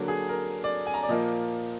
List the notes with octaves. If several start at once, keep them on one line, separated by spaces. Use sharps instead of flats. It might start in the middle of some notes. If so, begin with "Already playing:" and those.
Already playing: D3 F#3 A#3
G#4
A#4
D5
G#5
A#5
D5
A#2 F3 A#3 D#5